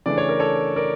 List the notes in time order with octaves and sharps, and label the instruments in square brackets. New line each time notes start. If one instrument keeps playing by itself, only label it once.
[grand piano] C#3 E3 A3 D4 D5
C#5
A#4
A4 C#5
A#4 D5